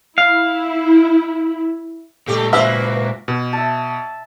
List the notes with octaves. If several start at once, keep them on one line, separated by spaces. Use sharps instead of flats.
E4 F5
A#2 G#3 A3 G4 A4
A#3 F#4 B4 C5 E5
B2
E5 A5